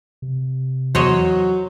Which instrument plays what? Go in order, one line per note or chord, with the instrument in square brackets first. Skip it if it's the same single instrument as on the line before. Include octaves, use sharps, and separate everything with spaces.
[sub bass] C3
[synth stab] E2 [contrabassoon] F#3 [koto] C5 C#5 D#5